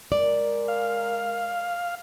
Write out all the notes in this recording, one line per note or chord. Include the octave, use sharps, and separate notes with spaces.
G#3 A#4 D5
F5